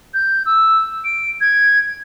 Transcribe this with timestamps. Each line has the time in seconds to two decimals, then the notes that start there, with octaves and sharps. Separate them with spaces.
0.14 G6
0.46 E6
1.05 D7
1.41 G#6